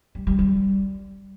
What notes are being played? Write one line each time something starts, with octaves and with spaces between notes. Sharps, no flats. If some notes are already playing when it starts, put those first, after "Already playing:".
G3
G3
G3